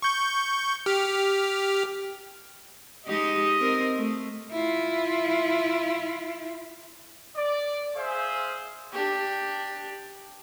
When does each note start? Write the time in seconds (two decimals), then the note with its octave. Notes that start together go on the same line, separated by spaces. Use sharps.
0.02 C#6 G6
0.86 G4 F6
3.06 G#3 D#4 G4 D#5
3.60 C4 A#4
3.96 A3
4.52 E4 F4
7.36 D5
7.96 G#4 C5 E5 F5
8.92 D4 G4